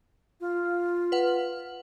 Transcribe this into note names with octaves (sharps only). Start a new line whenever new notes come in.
F4
B4 F#5